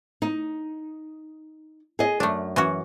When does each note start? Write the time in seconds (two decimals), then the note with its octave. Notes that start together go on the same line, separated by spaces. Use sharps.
0.22 D#4
1.99 G#4 D#5
2.20 F#2 A3 D4
2.56 E3 C#4 F#4